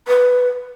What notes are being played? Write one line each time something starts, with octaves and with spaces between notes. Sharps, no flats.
B4